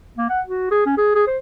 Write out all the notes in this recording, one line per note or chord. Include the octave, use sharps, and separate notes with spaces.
A#3
F#5
F#4
G#4
C#4
G#4
G#4
C5